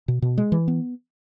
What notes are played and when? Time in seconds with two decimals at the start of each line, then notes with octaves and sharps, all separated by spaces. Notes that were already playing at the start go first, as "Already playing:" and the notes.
0.08 B2
0.22 B2
0.38 G#3
0.52 E3
0.68 B3